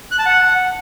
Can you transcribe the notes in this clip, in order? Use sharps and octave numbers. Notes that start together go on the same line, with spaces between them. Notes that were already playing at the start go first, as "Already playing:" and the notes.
F#6
A5
F#5